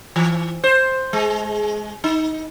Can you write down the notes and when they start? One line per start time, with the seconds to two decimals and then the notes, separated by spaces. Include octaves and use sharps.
0.16 E3
0.64 C5
1.13 G#3
2.04 D#4